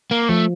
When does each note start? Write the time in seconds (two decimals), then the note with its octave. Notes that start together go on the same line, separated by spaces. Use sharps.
0.11 A#3
0.29 F3 A3